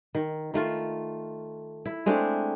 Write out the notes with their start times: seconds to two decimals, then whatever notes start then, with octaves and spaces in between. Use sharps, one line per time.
0.15 D#3
0.54 D#3 A3 F4
1.86 E4
2.06 G#3 A3 C4 D4